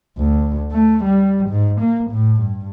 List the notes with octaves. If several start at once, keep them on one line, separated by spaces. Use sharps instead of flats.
D2
A3
G3
G#2
A#3
A2
G2